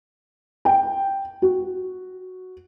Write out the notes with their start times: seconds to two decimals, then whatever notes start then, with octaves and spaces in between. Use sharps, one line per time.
0.65 G5
1.42 F#4